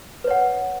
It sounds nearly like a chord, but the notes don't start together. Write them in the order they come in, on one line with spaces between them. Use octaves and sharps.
B4 C#5 F#5